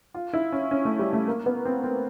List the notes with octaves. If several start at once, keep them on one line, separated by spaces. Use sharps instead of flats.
F4
E4
C#4
C#4
A3
G3
A3
A#3
B3
C4
C4